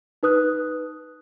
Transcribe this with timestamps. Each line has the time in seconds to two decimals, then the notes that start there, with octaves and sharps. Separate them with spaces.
0.23 D#4 B4 D#6 F#6